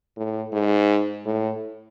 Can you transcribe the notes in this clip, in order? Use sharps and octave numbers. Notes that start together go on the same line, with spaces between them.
A2
G#2
A2